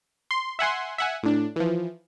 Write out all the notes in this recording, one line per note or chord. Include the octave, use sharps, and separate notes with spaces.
C6
E5 F#5 G#5 C6
E5 F#5 G#5
A2 D4
E3 F3